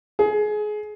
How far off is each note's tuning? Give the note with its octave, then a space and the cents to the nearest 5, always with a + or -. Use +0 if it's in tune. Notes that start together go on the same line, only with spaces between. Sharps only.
G#4 +25